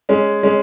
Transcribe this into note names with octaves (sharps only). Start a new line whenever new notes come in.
G#3 C#4
G#3 C#4